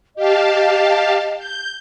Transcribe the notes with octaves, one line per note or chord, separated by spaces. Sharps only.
G4 D#5 F5 A5
G6